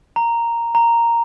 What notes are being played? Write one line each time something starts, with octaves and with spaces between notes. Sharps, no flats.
A#5
A#5